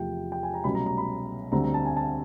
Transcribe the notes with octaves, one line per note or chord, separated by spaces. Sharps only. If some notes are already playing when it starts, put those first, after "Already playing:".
Already playing: E2 C3 F3 A3 G5
G5
G#5
A#5
C2 B2 F#3 A3 C#4 B5
A#5
A#5
B5
D2 D3 G3 C4 A#5
A#5
A5
G#5
A5